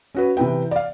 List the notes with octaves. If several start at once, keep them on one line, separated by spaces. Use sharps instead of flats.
C#4 F#4 B4
C3 E3 B4 G5
D5 F5